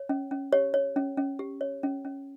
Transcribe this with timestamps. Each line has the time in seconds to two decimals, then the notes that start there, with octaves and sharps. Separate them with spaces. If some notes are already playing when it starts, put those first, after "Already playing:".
Already playing: C#5
0.09 C#4
0.31 C#4
0.52 G4 C#5
0.74 C#5
0.96 C#4
1.17 C#4
1.39 G4
1.61 C#5
1.83 C#4
2.05 C#4